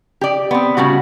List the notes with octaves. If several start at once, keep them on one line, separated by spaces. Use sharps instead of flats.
G4 D5
B3 C4
A2 C#3 G3 F#4